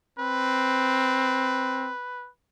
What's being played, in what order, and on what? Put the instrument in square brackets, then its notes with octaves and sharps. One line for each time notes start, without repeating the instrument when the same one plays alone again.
[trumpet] C4 [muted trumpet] B4